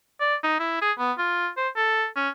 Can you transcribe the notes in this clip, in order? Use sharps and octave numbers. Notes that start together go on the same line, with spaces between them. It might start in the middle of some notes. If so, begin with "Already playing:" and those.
D5
D#4
E4
G#4
B3
F4
C5
A4
C#4